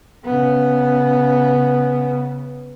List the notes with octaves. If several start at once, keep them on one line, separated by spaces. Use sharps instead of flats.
C#3 B3